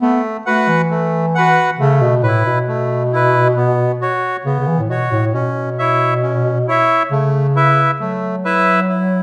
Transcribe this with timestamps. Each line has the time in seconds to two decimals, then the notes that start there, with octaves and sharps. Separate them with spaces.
0.02 A3 B3
0.46 A3 F#4 B4 F#5
0.68 E3
0.90 A3
1.35 F#4 B4 F#5
1.79 C#3 A3
2.02 B2
2.23 A2 E4 B4
2.46 B2
2.68 A3
3.13 E4 B4
3.57 B3
4.01 F#4 C#5
4.45 C#3 B3
4.60 C#3
4.68 E3
4.80 A2
4.90 B2 F#4 C#5
5.12 A2
5.34 B2 C#4
5.79 E4 C#5 E5
6.23 C#4
6.68 E4 C#5 E5
7.11 C#3 A3
7.56 E4 B4 E5
8.00 F#3 A3
8.45 E4 B4 E5
8.89 E4